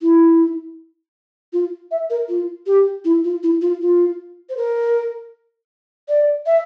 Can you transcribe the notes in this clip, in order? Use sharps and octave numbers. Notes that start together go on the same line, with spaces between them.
E4
F4
E5
A#4
F4
G4
E4
F4
E4
F4
F4
C5
A#4
D5
E5